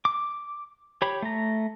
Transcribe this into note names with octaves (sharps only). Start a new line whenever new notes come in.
D6
G4 C#5 B5
A3 A#5